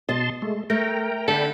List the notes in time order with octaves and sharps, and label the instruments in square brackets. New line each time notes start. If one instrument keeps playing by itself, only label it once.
[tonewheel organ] B2 A5 C6 [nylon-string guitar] D#5
[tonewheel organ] G#3 A3
[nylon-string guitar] A3 [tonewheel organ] A#4 G5 A#5
[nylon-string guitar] D3 [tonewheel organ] D4 G5 B5 [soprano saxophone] A4